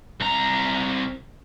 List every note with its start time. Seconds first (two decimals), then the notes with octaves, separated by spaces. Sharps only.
0.21 C2 A#5